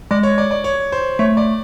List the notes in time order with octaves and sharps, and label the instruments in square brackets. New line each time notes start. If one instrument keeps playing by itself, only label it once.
[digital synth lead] G#3 [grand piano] D5
[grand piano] C#5
D5
D5
C#5
C5
[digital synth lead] A3 [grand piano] C#5
[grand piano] D5